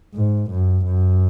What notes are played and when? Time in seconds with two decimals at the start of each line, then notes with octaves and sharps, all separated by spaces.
0.15 G#2
0.50 F#2
0.85 F#2